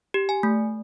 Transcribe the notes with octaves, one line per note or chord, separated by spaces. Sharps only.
G4
G#5
A3